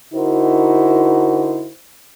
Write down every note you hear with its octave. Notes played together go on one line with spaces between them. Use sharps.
D3 D#4 E4 F#4 A#4 C5